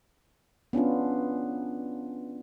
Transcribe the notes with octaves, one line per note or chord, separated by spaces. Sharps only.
B3 C#4 D4 F4